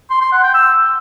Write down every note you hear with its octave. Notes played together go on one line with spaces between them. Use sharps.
C6
C6
F#5
G5
E6